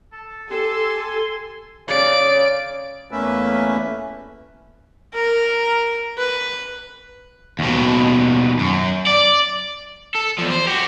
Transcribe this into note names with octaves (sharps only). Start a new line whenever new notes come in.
A4
G4 A4 G#5 C6
C#3 D5 D7
E2 A3 A#3 C#4 B4 E5
A#4
B4
D#2 B2
F#2
D5
A4
E2 F3
C5
F#4 G4